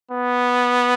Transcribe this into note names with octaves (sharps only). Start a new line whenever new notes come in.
B3